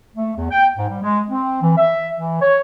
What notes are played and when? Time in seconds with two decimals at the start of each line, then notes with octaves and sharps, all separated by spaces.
0.15 A3
0.36 E2
0.51 G5
0.77 G#2
0.89 G3
1.03 G#3
1.29 C4
1.62 E3
1.77 E5
2.15 E3
2.42 C#5